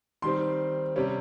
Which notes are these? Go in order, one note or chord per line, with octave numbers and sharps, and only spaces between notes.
D#3 G3 C4 C6
C3 G3 C#4